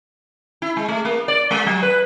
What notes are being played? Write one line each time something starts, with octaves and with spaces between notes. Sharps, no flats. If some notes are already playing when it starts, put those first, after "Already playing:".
E4
G#3
A3
A#3
D5
G#3
F#3
B4